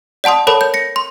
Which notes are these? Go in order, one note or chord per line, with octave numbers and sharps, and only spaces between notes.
D5 F#5 A5 C6 D#6
A4 A#4 C#5 A5 B5
G6
A#6 C#7
C6